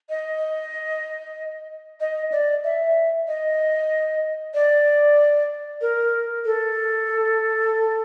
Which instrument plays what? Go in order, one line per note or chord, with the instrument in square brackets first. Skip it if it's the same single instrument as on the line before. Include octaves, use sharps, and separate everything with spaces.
[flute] D#5
D#5
D5
E5
D#5
D5
A#4
A4